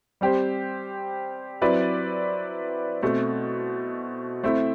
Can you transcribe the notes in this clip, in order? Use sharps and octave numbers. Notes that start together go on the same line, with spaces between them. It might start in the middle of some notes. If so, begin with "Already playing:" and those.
G3 C4 G4 C5
F#3 C4 E4 B4 D5
B2 A3 C4
A3 C4 E4